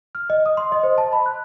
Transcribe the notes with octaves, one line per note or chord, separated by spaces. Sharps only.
F6
D#5
D#6
C6
D#5
C5
A5
B5
F#6